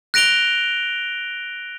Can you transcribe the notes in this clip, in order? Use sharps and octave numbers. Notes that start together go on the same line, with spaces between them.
F#6 A#6 D7 F7 G7